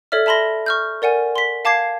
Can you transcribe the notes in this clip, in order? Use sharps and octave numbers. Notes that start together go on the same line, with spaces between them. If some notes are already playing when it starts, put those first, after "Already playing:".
A4 C#5 D5 E5 F6
E5 A5 B5 C6 A#6
C#6 F6 G6
A#4 D5 F#5 G#5
C6 B6
F5 A5 D6 G#6 C7